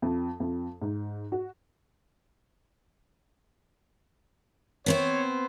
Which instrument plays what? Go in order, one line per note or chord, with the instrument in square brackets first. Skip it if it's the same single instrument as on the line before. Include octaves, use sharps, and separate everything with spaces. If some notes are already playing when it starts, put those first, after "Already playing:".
[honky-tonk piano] F2
F2
G#2
F#4
[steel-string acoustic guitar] B3 C4 C5 [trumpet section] C#5